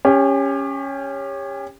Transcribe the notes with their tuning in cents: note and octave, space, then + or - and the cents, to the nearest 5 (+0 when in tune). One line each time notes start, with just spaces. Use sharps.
C#4 +0 G4 +30